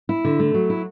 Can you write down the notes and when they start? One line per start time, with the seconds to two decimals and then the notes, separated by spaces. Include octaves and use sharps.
0.09 E4
0.25 D3
0.39 A3
0.54 F#3
0.70 E4